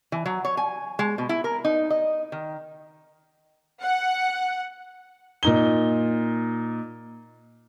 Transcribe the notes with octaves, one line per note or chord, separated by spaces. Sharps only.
E3
F#3
C#5
G#5
G#3
B2
E4
A#4
D#4
D#5
D#3
F#5
A#2 D#4 G7